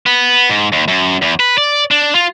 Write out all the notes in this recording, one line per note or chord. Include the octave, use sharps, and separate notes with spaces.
B3
G#2
D#2
F#2
E2
B4
D5
D4
F4